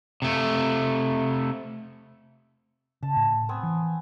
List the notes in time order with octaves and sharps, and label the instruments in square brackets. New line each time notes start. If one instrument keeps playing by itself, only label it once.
[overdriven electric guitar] C3 A3
[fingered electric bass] C#3 [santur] A5
[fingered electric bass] A2
[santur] B3 C4 G#5
[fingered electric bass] E3